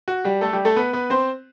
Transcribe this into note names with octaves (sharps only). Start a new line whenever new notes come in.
F#4
G3 G4
A3 A4
G3 G4
A3 A4
B3 B4
B3 B4
C4 C5